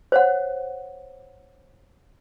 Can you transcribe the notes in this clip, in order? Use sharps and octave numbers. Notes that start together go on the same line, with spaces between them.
C5 C#5 F#5